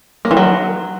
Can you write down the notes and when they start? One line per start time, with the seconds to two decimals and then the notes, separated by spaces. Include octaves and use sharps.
0.25 A#3
0.31 E3
0.37 F#3